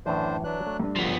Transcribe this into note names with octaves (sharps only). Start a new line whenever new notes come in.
F#2 A2 D3 E3 D4 C5
F#3 D4 B4 E5 F#6
A3
G2 D4
D2 C#3 F3 B3